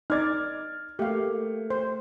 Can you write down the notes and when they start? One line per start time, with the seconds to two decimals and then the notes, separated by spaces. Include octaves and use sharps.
0.10 D#4 D5 F6 G#6 A6
0.99 A3 A#3 G4 F5
1.70 C5